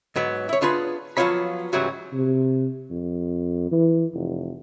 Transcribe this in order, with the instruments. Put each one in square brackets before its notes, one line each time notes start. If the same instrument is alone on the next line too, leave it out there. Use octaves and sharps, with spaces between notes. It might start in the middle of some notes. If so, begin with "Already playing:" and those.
[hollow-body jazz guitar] G#2 F#3 B3
E4 C#5
B3 D4 F4 G#4 B4
F3 F#3 B3 F4 C#5 B5
G#2 C#3 E3 F#3 G3 F#4
[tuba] C3
F2
E3
F1